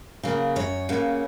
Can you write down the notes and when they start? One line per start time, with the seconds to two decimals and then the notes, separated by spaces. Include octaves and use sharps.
0.23 C#3 F#3 A#3
0.56 F#2 C#5
0.89 C#3 F#3 A#3